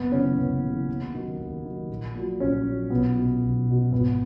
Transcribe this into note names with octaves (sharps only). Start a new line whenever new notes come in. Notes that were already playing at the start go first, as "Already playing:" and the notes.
Already playing: F#1 B3
F#2 C#3 E3 C#4
F#1 B3
F#2 C#3 E3
D#2
D#3 F#3
D#2
D#3 F#3
A#1
A#2 F#3
A#1 C#4
A#2 F#3
B1 B3
B2 F#3
B1
B2 F#3
G#1 B3